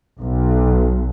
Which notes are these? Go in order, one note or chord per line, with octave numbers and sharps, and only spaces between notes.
B1